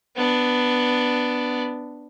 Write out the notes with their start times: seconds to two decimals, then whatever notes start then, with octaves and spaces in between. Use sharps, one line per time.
0.16 B3 D4